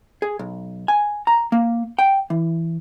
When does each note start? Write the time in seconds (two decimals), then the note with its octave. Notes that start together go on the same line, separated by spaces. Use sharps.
0.22 G#4
0.39 B1
0.88 G#5
1.27 A#5
1.52 A#3
1.99 G5
2.30 E3